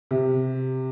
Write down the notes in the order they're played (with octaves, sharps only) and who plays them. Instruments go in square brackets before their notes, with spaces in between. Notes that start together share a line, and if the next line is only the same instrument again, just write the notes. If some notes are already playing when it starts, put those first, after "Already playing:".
[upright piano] C3